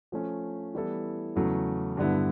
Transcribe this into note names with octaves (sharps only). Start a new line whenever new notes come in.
F3 A3 C#4
E3 G3 B3 E4 A4
E2 C#3 F#3 A3
G2 D3 G3 B3 E4